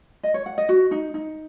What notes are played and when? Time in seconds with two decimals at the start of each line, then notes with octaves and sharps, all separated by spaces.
0.23 D#5
0.34 C#5
0.46 F#5
0.58 D#5
0.69 F#4
0.91 D#4
1.14 D#4